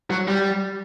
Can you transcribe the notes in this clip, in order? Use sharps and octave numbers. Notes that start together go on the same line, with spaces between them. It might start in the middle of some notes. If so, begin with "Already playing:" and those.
F#3
G3